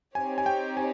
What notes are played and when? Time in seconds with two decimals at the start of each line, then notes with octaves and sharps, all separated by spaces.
0.15 C4 D#4 G4 C#5 G#5
0.38 G#5
0.46 G5
0.77 G#5